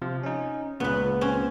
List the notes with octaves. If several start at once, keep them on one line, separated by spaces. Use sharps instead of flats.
C3 F3
C#4 D#4
C#2 A#2 C#3 B3 B4
C4 C#4